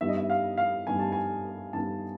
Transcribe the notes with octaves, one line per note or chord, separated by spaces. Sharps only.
G2 D#3 G3 B3 E5
D#5
E5
F5
F5
G2 D#3 G3 B3 G#5
A5
G#5
G2 D#3 G3 B3 A5